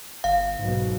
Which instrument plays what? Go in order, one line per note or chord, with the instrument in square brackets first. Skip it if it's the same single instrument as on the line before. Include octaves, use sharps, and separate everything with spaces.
[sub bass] G1 [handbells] F5
[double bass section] B1 B2 [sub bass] G#2